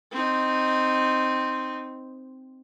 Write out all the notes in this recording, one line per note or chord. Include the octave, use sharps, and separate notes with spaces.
C4 D#4